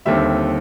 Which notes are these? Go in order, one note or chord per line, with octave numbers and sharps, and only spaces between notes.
D#2 D3 G3 C4 E5